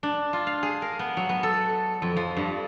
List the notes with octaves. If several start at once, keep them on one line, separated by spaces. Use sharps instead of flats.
D4
F4
F5
G#4
A#4
B3
F#3
B3
A4
F2
F3
G2